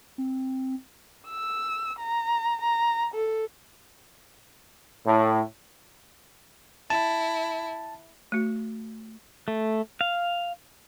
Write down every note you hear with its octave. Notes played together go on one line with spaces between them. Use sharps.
C4
E6
A#5
A#5
A4
A2
E4 A5
A3 F#4
A3
F5